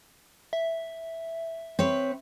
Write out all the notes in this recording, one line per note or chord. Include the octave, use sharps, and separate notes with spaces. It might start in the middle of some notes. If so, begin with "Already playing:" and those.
E5
C4 B4 C#5